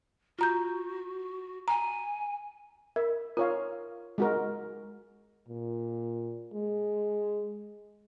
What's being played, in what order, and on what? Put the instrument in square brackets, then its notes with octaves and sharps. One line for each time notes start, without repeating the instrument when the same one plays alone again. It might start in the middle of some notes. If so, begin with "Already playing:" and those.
[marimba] F4 A#5 G6 [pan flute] F#4
[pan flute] G#5 [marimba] A#5
[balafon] A#4 [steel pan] E5
[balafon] F4 [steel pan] A#4 C#5 F5
[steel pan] G#3 F#4 A#4
[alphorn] A#2
G#3